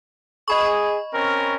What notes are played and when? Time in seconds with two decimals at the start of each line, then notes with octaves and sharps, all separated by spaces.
0.48 G#4 D#5 B5 C#6
1.13 C4 C#4 A#4